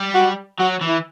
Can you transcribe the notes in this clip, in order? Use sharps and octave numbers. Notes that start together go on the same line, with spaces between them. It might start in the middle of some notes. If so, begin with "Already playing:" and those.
Already playing: G3
F#4
F#3 F#4
E3
E4